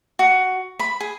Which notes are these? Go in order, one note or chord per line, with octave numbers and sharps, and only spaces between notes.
F#4
B5
G#4